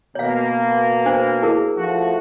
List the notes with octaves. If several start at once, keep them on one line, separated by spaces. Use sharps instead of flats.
B2 A#3 C#5 F5
D4 C5
E4 G#4 A#4
F3 A3 F#4